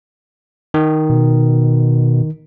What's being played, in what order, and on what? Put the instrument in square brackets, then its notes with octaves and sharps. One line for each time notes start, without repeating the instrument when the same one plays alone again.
[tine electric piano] D#3
[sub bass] B2